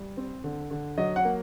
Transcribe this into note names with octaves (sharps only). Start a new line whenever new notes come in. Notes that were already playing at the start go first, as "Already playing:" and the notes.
Already playing: G3
C4
D3
D3
F#3 D#5
F#5
A#3